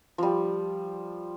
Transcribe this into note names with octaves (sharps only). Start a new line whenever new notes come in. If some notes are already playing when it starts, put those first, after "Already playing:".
F3 G3